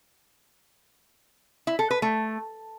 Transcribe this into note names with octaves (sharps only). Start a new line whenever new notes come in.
E4
A4
B4
A3